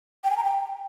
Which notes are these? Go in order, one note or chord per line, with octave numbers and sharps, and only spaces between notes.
G5
G#5
A#5
G5